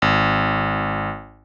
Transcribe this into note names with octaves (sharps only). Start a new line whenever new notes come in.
G#1